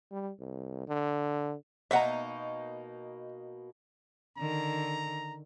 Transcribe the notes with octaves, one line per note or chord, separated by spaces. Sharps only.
G3
C2
D3
B2 A#3 D#4 E5 F#5 A#5
D3 D#3 A#5